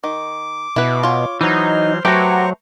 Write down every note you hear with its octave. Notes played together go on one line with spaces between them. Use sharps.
D#3 D6
B2 E4 B4
F4 C#5
E3 F#3 D#4 C5 C6 F6
F#3 A3 F#4 G4 B4 C5 A#5 C#6